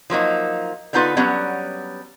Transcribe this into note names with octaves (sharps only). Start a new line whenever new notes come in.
F3 F#3 A#3 D#4
D3 G3 B3 D#4 F4 B4
F#3 G3 B3 C#4